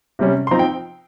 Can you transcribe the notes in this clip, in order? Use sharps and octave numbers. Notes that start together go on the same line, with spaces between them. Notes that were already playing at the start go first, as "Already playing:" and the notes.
C3 G3 C#4
C6
F3 C4 D#4 A#5
G5